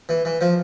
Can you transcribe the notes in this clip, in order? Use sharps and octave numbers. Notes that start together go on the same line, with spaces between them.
E3
E3
F3